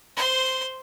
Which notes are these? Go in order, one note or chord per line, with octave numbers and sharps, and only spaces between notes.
C5 C6